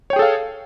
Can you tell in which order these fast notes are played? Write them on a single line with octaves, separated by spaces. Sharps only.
C#5 G5 G#4 A4 F5